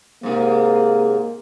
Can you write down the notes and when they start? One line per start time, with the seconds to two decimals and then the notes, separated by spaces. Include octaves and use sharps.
0.23 G#2 C3 A#3